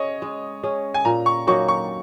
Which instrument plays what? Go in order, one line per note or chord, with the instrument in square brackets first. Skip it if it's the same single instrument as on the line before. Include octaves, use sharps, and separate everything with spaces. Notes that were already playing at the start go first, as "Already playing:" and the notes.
Already playing: [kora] C#4 G#4 [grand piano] C#5 D#5
[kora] G#3
C#4 G#4
[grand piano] G#5
[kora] A#2 [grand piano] A#5
[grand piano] C#6
[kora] F#3 A#3 D#4 [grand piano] C#6
[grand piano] C#6